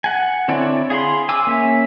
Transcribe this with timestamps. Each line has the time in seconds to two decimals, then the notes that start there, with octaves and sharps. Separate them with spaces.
0.04 F#5 G#5
0.48 D3 C4 E4 C#5 D5
0.90 G#4 F5 B5 C6
1.29 G#5 D6 E6
1.47 A#3 C#4 E5